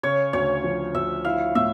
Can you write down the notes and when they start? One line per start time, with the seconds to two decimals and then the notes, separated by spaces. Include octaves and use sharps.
0.03 C#3 C#5
0.33 D2 C#5
0.64 F3
0.94 D2 E5
1.25 E4 F5
1.55 A2 E5